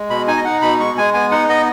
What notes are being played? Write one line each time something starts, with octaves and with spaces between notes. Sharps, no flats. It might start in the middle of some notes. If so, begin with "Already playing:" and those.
Already playing: G#3
B2 B5
D#4 G#5
D#5
D#4 F#5
B2 B5
G#3 C#6
G#3 G#5
B3 G#5
D#4 F#5
B3 D#5